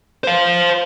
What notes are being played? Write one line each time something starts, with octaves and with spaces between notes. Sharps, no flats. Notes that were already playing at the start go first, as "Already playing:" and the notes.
C5 F5